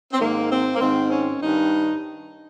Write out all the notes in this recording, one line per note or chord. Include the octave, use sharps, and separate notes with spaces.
C4
G#2 D#3 A#3
C4
A#3
G#2 D#3 C4
C#4
G2 D#3 D#4